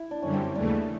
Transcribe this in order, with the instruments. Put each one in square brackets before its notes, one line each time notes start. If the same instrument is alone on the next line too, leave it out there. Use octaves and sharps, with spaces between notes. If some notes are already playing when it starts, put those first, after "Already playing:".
Already playing: [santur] E4
D4
[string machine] F#2 D3 G3 [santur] C#4
[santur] C4
C#4
[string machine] D#2 C#3 E3 A3 [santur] D4